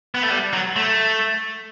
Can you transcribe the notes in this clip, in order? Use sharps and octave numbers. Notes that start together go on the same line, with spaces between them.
B3
A3
G3
F#3
A3